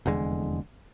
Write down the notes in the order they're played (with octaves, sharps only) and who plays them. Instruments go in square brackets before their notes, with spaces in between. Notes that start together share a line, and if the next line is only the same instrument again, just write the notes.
[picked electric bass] F1 E2 D3 G#3